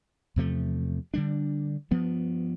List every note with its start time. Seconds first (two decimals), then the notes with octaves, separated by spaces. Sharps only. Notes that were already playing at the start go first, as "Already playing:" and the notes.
0.36 E2 C3 F3 A3
1.14 D3 G3 D4
1.91 G2 F3 B3